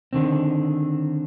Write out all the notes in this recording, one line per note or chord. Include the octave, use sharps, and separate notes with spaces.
D3 D#3 C4